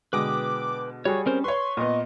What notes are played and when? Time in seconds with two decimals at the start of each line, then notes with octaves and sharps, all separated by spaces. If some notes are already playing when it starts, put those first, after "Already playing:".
0.13 B2 D3 G#3 B4 G5 D6 D#6
1.05 G3 F#4 G#4 C#5
1.26 C4 C#4 A#4 C5
1.44 B4 C#5 C6 C#6
1.77 A#2 B3 D#5